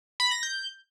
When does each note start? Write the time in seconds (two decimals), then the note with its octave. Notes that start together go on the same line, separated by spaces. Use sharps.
0.20 B5
0.31 A#6
0.43 G6